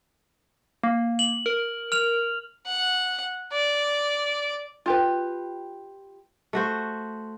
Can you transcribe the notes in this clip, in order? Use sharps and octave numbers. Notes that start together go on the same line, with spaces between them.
A#3
F#7
A#4
F6 F7
F#5
D5
F4 G4 B4
A3 F#4 C5